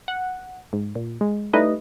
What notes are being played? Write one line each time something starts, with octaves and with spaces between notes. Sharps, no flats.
F#5
G#2
A#2
G#3
G3 A3 D#4 E4 B4 D#5